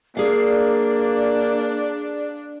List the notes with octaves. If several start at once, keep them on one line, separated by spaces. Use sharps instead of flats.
A#3 D4 G#4 D5 F5